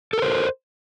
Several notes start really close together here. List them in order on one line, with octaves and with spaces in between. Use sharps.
A4 A#4 C5